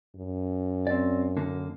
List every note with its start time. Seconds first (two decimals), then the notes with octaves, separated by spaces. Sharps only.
0.16 F#2
0.87 C4 D5
1.37 D3 A#3